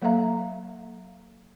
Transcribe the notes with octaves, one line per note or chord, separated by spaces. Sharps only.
F#3 A#3 A4 E5 F5 A#5